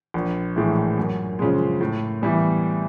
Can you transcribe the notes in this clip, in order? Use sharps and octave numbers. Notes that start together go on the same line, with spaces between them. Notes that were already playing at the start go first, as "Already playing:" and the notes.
A#1
A2 E3 G#3
F#2
C#3 F3 G#3
A2
E3 G3 B3